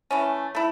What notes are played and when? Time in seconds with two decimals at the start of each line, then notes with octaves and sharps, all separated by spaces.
0.11 E3 A3 C#4
0.55 A3 E4